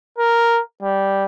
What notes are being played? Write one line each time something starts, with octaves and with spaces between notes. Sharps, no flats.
A#4
G3